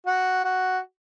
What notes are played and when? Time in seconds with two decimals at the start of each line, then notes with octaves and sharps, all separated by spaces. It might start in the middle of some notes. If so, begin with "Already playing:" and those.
0.06 F#4
0.44 F#4